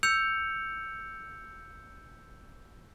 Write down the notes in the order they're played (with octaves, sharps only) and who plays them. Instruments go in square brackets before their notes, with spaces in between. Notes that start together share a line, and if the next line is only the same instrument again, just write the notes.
[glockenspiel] E6 G6 C#7 F7